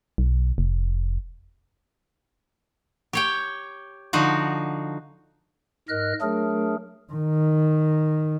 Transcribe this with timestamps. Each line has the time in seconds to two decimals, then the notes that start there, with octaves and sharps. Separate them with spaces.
0.18 B1
0.58 F1
3.13 G4 C#5 G5
4.13 D3 F3 D#4 F#4
5.89 G#2 A#4 D#5 F6 F#6
6.22 F#3 A3 D4 G#4 A#4
7.13 D#3